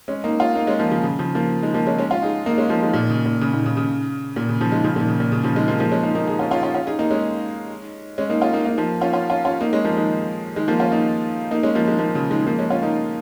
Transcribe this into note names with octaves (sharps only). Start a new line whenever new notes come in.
G#3 C#4
A#3 D#4
C#4 F4
A#3 D#4
G#3 C#4
F3 A#3
C#3 F3
C#3
C#3 F3
F3 A#3
D#3 G#3
F3 A#3
G#3 C#4
G#3 C#4
C#4 F4
D#4 G#4
A#3 D#4
G#3 C#4
F3 A#3
D#3 G#3
A#2 D#3
C#3
A#2
C#3
A#2 D#3
C#3
C#3
A#2
C#3
C#3 F3
D#3 G#3
C#3 F3
A#2 D#3
C#3
A#2
C#3
C#3 F3
D#3 G#3
F3 A#3
F3 A#3
G#3 C#4
A#3 D#4
A#3 D#4
D#4 G#4
C#4 F4
C#4 F4
C#4 F4
C#4 F4
D#4 G#4
A#3 D#4
G#3 C#4
G#3 C#4
A#3 D#4
C#4 F4
A#3 D#4
A#3 D#4
F3 A#3
C#4 F4
C#4 F4
C#4 F4
C#4 F4
A#3 D#4
G#3 C#4
F3 A#3
D#3 G#3
D#3 G#3
F3 A#3
C#4 F4
A#3 D#4
A#3 D#4
G#3 C#4
F3 A#3
D#3 G#3
F3 A#3
C#3 F3
D#3 G#3
F3 A#3
G#3 C#4
C#4 F4
A#3 D#4